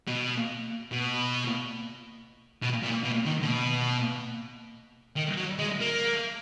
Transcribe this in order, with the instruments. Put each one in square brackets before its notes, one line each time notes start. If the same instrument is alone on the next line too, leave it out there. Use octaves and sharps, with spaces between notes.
[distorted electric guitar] B2
B2
B2
A#2
B2
D#3
D3
B2
D#3
F#3
G#3
A#3